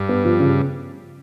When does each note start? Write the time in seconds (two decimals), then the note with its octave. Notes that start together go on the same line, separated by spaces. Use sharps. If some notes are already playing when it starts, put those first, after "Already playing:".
Already playing: G2
0.09 B3
0.25 F3
0.40 C#3